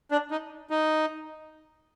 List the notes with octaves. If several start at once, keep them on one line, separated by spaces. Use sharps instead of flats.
D4
D#4
D#4